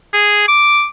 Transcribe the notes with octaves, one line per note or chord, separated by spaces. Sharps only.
G#4
D6